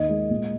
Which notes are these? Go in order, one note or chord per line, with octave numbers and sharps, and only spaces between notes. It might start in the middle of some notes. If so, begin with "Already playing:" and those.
Already playing: D#2 D#5
G#3
A#2